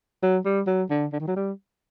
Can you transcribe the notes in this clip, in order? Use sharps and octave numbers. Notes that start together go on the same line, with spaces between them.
F#3
G3
F#3
D3
D3
D#3
F#3
G3